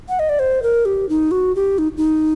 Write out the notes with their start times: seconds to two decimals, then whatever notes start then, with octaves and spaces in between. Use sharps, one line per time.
0.09 F#5
0.19 D#5
0.29 D5
0.39 C5
0.63 A#4
0.85 G4
1.09 D#4
1.31 F#4
1.55 G4
1.78 D#4
1.97 D#4